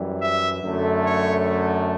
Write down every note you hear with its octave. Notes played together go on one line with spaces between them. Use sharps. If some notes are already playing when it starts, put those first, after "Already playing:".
Already playing: F#2 E3 G3
E5
F#2 D3 A3
C#5